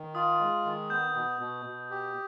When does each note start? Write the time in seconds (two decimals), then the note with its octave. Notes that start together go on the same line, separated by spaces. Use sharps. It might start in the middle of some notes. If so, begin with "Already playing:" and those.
Already playing: D#3
0.15 F4 D#6
0.40 G#3
0.65 D#3
0.90 B3 G6
1.15 B2
1.40 B2
1.66 B2
1.91 G4